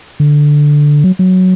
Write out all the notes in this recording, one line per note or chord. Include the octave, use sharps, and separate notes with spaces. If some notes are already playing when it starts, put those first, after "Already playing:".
D3
F#3
F#3